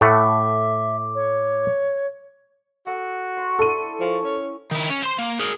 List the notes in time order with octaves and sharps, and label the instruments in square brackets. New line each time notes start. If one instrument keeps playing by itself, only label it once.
[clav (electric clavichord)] A2 A3 F#5 [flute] E5 [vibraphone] D6
[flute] C#5
[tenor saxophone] F#4 [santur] A4 F#5
[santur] C6 C#6
[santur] D4 E4 [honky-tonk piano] A4 D#7
[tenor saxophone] F3 [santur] A#4 C#5 G#5
[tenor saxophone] C#4
[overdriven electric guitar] D#3 E4
C#4
C5 C6
A#3
G#4 A#4